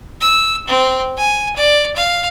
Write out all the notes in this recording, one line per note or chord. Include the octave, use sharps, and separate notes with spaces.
E6
C4
G#5
D5
F5